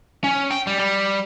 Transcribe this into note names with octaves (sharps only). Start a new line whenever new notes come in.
C#4
G5
G3
G3